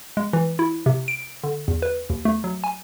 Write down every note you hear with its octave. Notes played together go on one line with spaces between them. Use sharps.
G#3
E3
E4
C3
D7
D3
E2
B4
D#2
A3
F#3
G#5